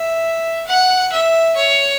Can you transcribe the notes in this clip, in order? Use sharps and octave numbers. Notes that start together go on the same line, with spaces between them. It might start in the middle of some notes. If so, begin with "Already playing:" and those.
Already playing: E5
F#5
E5
C#5